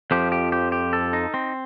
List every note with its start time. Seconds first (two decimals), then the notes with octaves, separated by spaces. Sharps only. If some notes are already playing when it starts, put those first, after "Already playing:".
0.11 F2 F3 G4
0.32 G4
0.52 G4
0.72 G4
0.93 A4
1.13 D#4
1.34 C4